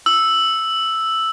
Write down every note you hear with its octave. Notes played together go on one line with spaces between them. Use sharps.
E6